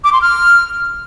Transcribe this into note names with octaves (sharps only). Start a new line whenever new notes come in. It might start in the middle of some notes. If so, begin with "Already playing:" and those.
D6
C6
F6